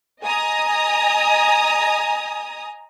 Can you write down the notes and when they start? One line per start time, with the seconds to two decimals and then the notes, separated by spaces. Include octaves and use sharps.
0.23 D#5 G#5 A#5 D#6